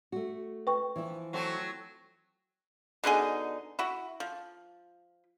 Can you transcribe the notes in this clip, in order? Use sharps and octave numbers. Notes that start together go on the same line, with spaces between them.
A3 F#4
B4 G5 C#6
E3 F3 E4
F#3 A3 C4
B2 D3 D#4 G#4
E4 F#4
F3